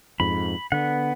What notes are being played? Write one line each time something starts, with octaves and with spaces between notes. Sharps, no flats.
F2 G#2 B5
D3 B3 F#5